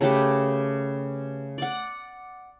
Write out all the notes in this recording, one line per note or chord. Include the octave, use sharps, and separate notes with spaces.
C#3 A3 G4 B4
D5 F#5